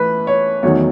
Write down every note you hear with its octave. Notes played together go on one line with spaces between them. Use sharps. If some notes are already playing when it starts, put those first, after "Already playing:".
Already playing: E3 A3 B4
C#5
E2 D#3 F#3 A3 D#4 C#5